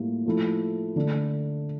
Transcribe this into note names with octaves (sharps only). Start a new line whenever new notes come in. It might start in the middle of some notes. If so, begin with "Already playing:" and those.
Already playing: A2 G3 A#3 F4
F3 A3 E4
D3 A3 D4